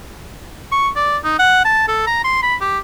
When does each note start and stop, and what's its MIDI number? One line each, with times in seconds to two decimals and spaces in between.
0.72 0.89 85
0.96 1.17 74
1.24 1.38 63
1.39 1.62 78
1.65 1.87 81
1.88 2.04 69
2.07 2.20 82
2.24 2.39 84
2.43 2.55 83
2.61 2.78 67